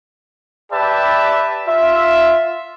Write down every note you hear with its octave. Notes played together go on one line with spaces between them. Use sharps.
G4 B4 D5 E5 A5
F4 E5